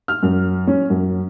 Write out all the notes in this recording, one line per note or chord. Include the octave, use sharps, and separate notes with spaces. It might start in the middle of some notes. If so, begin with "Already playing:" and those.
F6
F#2
C#4
F#2